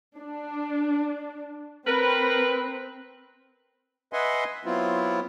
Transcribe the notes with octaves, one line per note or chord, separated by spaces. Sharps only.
D4
C4 A#4 B4
B4 D#5 E5 F#5 G#5 C6
F#3 B3 C4 E4 F4